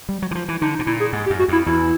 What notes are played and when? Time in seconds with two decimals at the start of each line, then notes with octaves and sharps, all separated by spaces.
0.09 G3
0.22 F#3
0.31 E3
0.35 F3
0.48 E3
0.61 D3 D#4
0.74 D#4
0.79 B2
0.87 A#2 E4
1.00 G#4
1.13 G#2
1.26 G4
1.30 F#2
1.39 F#4
1.48 F2 E4
1.66 E2 E4